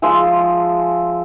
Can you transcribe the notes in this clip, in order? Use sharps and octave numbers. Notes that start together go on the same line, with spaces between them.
F3 G#3 E5 G#5